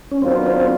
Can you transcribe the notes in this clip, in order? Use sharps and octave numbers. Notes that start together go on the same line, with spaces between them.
C#4
D#3 F#3 B3 C4 D4 F4
C4